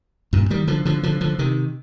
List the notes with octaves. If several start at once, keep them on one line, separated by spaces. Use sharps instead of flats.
G2 A#2
D#3 G3
D3 F3
D3 F3
D3 F3
D3 F3
C3 D#3